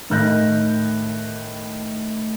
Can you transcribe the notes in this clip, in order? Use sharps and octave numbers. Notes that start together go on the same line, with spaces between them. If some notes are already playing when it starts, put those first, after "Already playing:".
A2 D#3 F#6 G6 A#6